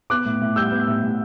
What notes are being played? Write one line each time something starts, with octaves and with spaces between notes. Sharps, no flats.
B3 D6 F#6
A2
A2
G3 E6 G6
B3
A2
A2